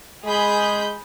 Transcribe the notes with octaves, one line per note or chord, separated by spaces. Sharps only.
G#3 G#4 B5 G6